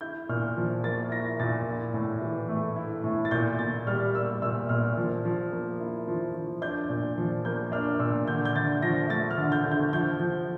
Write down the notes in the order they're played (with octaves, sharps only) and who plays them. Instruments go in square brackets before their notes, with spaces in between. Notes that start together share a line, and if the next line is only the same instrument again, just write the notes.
[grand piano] E4 G6
A#2 F6
F3
A#3 A6
E4 A#6
A#2 A6
E4
A2
E3
A3
E4
A2
A6
A#2 G6
A#2 A6
G3 F6
A#3 E6
A#2 E6
A#2 F6
F3
F3
A#3
E4
F3
F3
D4 G6
A#2
F3
A#3 G6
D4 F6
A#2 E6
D3 G6
G6
D3 A6
F3 A#6
A3 A6
F6
D3
G6
D3
G6
F3 G6
F3